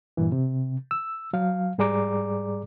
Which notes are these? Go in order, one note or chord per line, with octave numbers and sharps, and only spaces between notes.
G2 A#2 E3
C3
E6
F#3 F5
G#2 G3 G#4 D5 A#5 D6